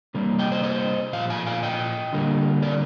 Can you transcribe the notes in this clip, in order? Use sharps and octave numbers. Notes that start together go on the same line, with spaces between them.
C3 G3 A#3
D#5 G5
C5 D#5
C5 D#5
A#2 F3 F5
F5 G#5
F5 G#5
D#5 G5
D3 G3 A#3
A#4 D5